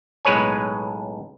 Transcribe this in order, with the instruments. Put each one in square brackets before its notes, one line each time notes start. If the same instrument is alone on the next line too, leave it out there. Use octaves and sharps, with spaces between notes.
[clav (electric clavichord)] B1 A2 G#3 B4 C#5 G#5